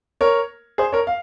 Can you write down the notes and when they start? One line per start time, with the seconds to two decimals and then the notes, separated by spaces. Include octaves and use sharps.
0.21 A#4 C#5
0.78 G#4 C5
0.93 A#4 C#5
1.07 F5